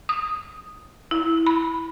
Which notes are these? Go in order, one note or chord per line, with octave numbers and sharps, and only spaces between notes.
D#6
E4
B5